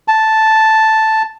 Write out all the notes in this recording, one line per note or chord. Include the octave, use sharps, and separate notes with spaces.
A5